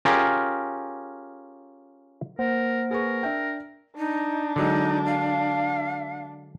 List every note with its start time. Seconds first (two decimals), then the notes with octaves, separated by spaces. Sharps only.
0.05 C#4 F4 G4 G#4 A#4
2.39 A#3 A#4 C5 F#5
2.91 G#4 A#4 B4 C#6
3.23 D4 E5 G5
3.98 D4 D#4
4.56 D3 F#3 G#3 D#4
5.06 F5